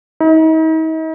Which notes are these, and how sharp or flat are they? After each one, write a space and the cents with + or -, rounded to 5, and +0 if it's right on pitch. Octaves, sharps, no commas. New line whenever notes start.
D#4 +40